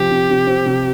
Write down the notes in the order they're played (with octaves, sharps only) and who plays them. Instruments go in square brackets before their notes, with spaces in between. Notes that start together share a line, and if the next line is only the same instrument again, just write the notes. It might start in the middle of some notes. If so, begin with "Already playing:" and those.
Already playing: [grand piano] C3 F3 [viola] G4
[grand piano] C3
C3
C4
C3